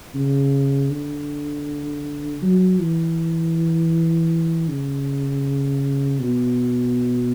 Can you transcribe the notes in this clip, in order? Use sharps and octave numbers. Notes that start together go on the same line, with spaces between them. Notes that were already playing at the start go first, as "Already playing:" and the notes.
C#3
D3
F#3
E3
C#3
B2